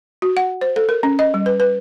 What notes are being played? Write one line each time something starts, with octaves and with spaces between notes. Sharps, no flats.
F#4
F#5
C5
A4
A#4
C#4
D#5
G3
B4
B4